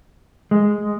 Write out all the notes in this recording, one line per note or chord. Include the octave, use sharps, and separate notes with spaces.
G#3